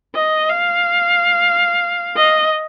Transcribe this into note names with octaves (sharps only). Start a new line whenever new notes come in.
D#5
F5
D#5